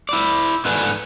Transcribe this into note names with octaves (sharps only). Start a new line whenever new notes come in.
E4 D5
G#2 D3 A3 B4 D5 G#5